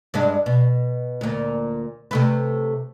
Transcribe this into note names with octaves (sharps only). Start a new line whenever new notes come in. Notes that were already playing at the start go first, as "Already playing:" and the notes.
G2 G#3 D4
B2
D2 A#2
C3 A3 B4